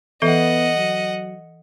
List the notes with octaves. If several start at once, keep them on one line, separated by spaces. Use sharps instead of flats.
E3 B3 A4 D#5 E5 F#5
F#3